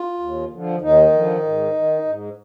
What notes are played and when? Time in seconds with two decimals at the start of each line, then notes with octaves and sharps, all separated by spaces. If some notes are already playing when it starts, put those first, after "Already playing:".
Already playing: F4
0.20 D#2
0.50 D3 F3
0.81 D#2 D#3 D#4
1.12 D3 F3
1.43 G#2
1.73 D#3
2.05 G#2